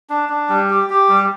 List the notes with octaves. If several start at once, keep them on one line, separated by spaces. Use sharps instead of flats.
D4
D4
G3
G4
G4
G3